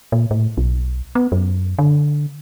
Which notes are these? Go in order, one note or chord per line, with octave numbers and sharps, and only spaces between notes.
A#2
A2
B1
B3
F#2
D3